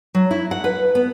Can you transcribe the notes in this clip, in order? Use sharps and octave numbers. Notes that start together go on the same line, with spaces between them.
F#3
E4
F#5
B4
B3